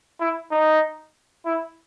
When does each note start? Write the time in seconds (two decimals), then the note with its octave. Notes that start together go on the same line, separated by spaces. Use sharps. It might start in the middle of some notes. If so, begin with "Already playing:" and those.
0.20 E4
0.51 D#4
1.45 E4